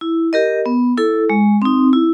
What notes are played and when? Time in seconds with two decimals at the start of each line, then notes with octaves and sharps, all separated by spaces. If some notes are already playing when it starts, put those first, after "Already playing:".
0.01 E4
0.33 G4 A#4 D#5
0.66 B3
0.97 E4 A4
1.30 G#3
1.62 C4 D#4
1.93 E4